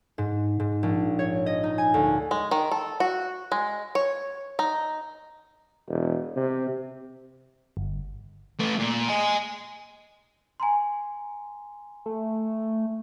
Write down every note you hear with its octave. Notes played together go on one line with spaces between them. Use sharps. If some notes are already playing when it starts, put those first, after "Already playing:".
G#2
G#2
A#1
C#5
D#5
D#4
G#5
D2
G#3
D#3
A4
F#4
G#3
C#5
D#4
E1
C3
G1
A3 B4
A#2
D#5 G#5
G#5 A#5 C6
A3